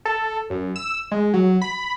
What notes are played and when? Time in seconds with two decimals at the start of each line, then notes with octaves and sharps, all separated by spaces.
0.05 A4
0.50 F#2
0.76 E6
1.11 G#3
1.34 F#3
1.62 B5